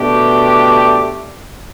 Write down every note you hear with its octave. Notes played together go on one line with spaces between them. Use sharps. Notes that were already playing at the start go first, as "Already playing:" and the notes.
Already playing: B2 A3 D4 G4